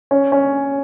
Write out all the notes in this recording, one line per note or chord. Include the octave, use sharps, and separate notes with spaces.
C#4
C#4